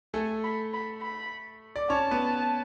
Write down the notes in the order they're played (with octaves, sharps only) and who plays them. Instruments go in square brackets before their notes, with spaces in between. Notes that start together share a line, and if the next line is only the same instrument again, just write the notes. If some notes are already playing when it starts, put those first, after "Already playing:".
[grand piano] A3 A4 [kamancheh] G#5
[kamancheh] B5
B5
B5
[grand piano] D5
[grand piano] C#4 C#5 [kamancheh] A5
[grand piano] B3 B4